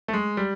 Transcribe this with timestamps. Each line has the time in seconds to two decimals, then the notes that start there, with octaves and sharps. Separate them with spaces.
0.08 A3
0.13 G#3
0.37 G3